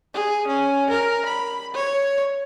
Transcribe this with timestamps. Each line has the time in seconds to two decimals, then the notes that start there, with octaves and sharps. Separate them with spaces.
0.14 G#4
0.47 C#4
0.90 A#4
1.26 B5
1.74 C#5